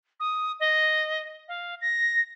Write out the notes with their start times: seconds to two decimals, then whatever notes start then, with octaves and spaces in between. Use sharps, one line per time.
0.20 D#6
0.60 D#5
1.48 F5
1.81 A#6